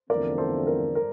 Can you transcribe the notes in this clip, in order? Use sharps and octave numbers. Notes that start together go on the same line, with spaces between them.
E2 D3 F3 A3 C4 A#4 D5
A4 C5
A#4
A#4